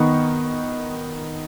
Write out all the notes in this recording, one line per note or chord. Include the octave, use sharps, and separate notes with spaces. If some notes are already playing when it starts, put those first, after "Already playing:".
Already playing: D#3 B3 D#4 C#6